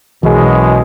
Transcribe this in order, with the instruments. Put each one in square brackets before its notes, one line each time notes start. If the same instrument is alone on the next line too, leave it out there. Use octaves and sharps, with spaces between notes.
[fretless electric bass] B1 E3 [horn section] F#2 B2 G#3